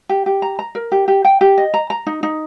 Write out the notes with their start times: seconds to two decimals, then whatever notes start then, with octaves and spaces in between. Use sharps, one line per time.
0.09 G4
0.26 G4
0.42 A#5
0.59 A#5
0.75 A#4
0.92 G4
1.08 G4
1.25 G5
1.41 G4
1.58 D#5
1.74 A#5
1.90 A#5
2.07 D#4
2.23 D#4